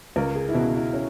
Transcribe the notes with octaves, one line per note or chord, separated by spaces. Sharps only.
C#2 A#4
G#4
E4
B2 F#4
E4
C#4